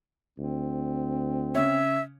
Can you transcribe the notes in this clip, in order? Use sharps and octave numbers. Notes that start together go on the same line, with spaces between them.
D2 C4
C#3 C#5 E5